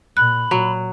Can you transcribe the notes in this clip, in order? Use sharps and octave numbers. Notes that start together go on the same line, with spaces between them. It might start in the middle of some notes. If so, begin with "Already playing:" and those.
A#2 B5 F#6
A#2 F#3